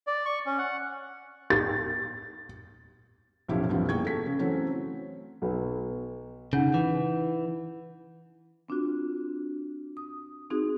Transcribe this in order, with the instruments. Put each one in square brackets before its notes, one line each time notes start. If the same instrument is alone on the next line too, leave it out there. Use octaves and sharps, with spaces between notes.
[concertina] D5
C#6
C#4
F#5
[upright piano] A6
[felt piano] B1 F#2 A2 F3 E4 G4
B1 F#2 E3 F3 G3 B3
G1 A#3 G#4 G5 C#6 G#6
A4 B6
C#3
E3 F#3 A3 C4 C#4
[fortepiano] B1 F#3
[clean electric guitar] C#3 [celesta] D#4 F#5 G6
[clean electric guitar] E3
[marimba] C4 D4 F4 F#4
D#6
C4 D#4 F#4 G#4